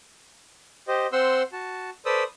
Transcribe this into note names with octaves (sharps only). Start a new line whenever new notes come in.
G4 C5 D#5
C4 C5 F#5 C6 E6
F#4 A5
A4 B4 C5 D5 D#6 E6